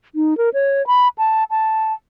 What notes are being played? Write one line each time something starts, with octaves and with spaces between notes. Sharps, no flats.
D#4
A#4
C#5
B5
A5
A5